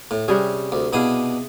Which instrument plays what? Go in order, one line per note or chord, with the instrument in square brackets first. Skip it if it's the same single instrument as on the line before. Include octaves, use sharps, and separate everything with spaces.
[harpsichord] A2
[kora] C3 G3 G#4 [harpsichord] C#4
[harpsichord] D2
[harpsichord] B2 D4 D#6 [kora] E4 G#4 F5